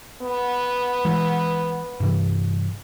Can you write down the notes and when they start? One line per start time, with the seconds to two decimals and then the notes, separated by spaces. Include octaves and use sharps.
0.22 B3
1.05 E3 G#3
2.00 G2 C3 E3